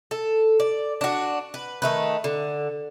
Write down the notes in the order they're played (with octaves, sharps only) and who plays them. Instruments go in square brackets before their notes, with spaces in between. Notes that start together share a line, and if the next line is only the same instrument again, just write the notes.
[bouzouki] A4
D5
D4 F#4
B4
D#3 A3 B4
D3